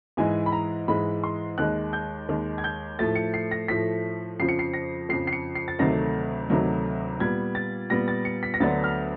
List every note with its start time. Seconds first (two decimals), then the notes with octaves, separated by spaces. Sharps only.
0.17 G#2 E3 G#3 G#5
0.46 B5
0.52 A#5
0.88 G#2 E3 G#3 B5
1.24 C6
1.58 D#2 D#3 G#3 F#6
1.93 G6
2.29 D#2 D#3 G#3
2.58 G#6
2.64 G6
2.99 A2 F3 A3 A6
3.15 C#7
3.34 C7
3.51 A#6
3.68 A2 F3 A3 B6
4.40 F2 C#3 F3 C7
4.49 C#7
4.59 C7
4.74 A#6
5.09 F2 C#3 F3 C7
5.27 C7
5.33 C#7
5.55 C7
5.68 A6
5.79 D2 C3 D#3 F#3 A3 A#6
6.50 D2 C3 D#3 F#3 A3
7.20 A#2 G3 B3 G#6
7.55 A6
7.90 A#2 G3 B3 A#6
8.08 A6
8.25 C#7
8.43 B6
8.54 A#6
8.60 D2 D3 F#3 B3 D4 A6
8.84 F6